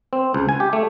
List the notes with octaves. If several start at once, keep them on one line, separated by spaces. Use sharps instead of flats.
C4
C#2
G#5
G4
A3